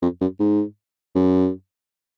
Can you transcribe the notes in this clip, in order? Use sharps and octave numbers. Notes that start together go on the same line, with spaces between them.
F2
F#2
G#2
F#2